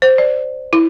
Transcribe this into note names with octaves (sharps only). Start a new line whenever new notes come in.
C5
D5
E4